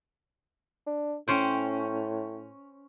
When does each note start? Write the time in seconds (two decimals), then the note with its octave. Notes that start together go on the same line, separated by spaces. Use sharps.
0.87 D4
1.28 A2 C#4 C5 G5